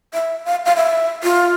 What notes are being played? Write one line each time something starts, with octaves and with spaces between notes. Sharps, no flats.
E5
F5
F5
E5
F4